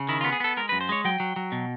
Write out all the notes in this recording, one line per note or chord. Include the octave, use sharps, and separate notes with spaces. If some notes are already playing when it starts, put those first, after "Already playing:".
Already playing: C#3
D#3 E4
F4
B3
G#4
B3 A4
G#3 A#4
F#2 B4
C5
G#3 C#5
F#3 G5
F#3
F#3
B2